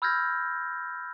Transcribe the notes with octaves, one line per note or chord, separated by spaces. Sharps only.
B5 E6 F6 G6 G#6 A#6